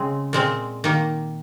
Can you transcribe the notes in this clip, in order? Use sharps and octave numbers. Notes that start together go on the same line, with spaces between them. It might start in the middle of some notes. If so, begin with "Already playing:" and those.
Already playing: C#3 G#3 C4
A#2 G#3 C4
D#3 A#3